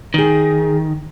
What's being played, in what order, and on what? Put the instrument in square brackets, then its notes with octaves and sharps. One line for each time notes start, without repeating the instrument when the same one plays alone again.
[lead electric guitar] D#3 [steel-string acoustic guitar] D#4 G#4